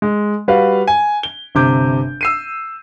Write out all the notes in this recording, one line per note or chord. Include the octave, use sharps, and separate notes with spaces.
G#3
G3 F#4 B4 F5
G#5
G7
G1 C3 D6 G6
E6 C7 D#7